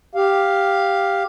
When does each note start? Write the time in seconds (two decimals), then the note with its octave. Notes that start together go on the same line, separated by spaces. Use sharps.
0.15 G4 F5